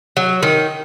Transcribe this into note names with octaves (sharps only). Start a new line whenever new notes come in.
F#3
D#3